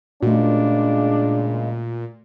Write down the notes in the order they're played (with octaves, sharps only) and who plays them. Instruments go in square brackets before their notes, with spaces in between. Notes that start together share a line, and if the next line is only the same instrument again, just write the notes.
[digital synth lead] A#2 [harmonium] C#3 G#3 [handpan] A3 F#4 [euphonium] D4